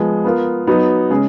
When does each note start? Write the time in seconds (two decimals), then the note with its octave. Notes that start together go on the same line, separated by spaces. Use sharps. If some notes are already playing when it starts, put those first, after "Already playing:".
Already playing: F3 G#3 B3
0.24 B3 F4 A#4
0.67 F#3 B3 D#4
1.10 C#3 G#3 C#4 G#4